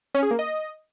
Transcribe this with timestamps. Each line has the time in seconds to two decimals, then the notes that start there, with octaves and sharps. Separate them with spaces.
0.15 C#4
0.23 G#4
0.31 A#3
0.39 D#5